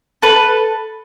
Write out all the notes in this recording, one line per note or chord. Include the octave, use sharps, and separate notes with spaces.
A4 B4